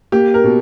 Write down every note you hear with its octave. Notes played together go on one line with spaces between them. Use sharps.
A#3 G4
A#4
B2